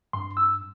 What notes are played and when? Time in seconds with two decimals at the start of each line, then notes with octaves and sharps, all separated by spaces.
0.13 G2 C6
0.37 E6